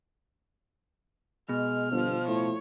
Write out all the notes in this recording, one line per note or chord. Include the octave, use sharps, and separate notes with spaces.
B2 G#3 F6
G1 F3
A2 C#5